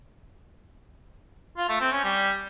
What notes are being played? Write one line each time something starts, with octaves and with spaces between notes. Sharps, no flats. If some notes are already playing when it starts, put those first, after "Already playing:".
F4
A3
C4
C#4
G3